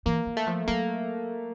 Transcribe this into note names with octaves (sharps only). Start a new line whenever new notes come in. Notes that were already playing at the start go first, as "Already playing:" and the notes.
E3 A#3
E3
A3
F3
F#3 A#3